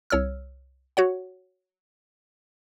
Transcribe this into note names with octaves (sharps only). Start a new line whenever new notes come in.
C2 C#5 E6 F6
F#4 C#5 F#5